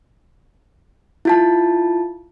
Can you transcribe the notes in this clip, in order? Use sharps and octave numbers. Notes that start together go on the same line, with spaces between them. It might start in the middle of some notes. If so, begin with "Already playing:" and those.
E4 F4 A5